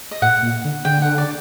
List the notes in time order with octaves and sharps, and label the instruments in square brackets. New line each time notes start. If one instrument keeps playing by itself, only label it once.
[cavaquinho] D#5
[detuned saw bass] A2 [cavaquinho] F#5
[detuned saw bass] A#2
D3
[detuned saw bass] D3 [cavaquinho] G5
[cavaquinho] F#5
D5